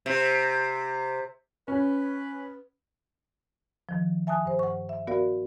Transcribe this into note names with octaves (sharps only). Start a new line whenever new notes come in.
C3
C#4 B4
D#3 F3
E5 G#5 A5 D#6 F#6
G2 C5
F#5 C#6
E5
B3 F#4 A#4 D5 F5